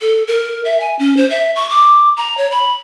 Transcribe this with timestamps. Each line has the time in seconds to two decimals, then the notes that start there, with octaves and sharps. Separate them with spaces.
0.01 A4
0.28 A#4
0.65 E5
0.80 G#5
0.99 C#4
1.17 C5
1.30 E5
1.56 C#6
1.70 D6
2.17 A#5
2.37 C#5
2.51 B5